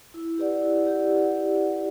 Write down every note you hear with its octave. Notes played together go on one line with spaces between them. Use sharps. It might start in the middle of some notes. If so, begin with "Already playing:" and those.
E4
G4 B4 D5 F#5
E4
G4 B4 D5 F#5